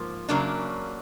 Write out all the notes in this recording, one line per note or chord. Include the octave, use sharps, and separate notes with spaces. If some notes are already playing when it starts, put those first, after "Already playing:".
Already playing: G#2 F3 A#3
F#2 C#3 F#3 A#3 D4